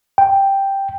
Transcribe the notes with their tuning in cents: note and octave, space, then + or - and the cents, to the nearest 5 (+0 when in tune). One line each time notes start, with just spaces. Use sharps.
G5 +0